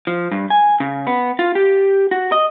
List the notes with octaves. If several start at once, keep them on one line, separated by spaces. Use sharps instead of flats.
F3
G2
G#5
C#3
B3
F4
G4
F#4
D#5